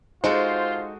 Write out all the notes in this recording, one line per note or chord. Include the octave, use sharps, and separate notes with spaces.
G#3 D#4 F4 F#4 A4 C5